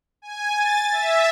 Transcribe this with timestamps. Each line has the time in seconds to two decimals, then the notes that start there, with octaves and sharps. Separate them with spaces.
0.22 G#5
0.56 A6
0.91 E5